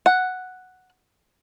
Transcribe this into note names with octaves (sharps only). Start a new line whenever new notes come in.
F#5